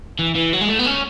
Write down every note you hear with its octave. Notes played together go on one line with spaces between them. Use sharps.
E3
E3
F#3
G#3
A3
B3
C#4